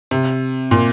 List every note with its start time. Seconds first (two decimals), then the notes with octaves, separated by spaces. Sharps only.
0.11 C3
0.71 A#2